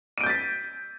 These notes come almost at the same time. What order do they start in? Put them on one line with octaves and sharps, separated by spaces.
D#7 D7 G6 A6 B6